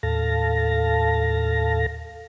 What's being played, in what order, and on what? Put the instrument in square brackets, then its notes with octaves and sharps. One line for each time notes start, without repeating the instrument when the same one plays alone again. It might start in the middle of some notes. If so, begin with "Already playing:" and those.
[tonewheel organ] D#2 A2 A4 F5 A5 A#6